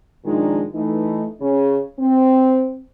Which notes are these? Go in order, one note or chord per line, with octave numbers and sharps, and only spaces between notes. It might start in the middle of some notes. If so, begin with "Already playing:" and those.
A#2 D#3 F3 G#3 D4 D#4
E3 A3 D#4
C#3 C#4
C4